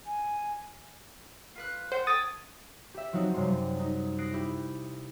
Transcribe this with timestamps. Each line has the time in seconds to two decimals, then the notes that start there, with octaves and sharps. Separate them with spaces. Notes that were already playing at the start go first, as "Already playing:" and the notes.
0.06 G#5
1.55 F4 B4 F#6
1.92 C5 F#5 G5 G6
2.07 A4 C#5 G5 D#6 A6
2.94 G4 E5
3.13 F3 F#3 C4 D#4 F#4
3.34 F#2 C3 F#3 G3 C6
3.79 D#4
4.18 D#6 F#6 A#6 C7 D7
4.33 E4 G4